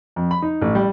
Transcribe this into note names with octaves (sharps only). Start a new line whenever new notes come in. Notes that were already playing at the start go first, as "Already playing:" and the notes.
F2
B5
D#4
A1
G3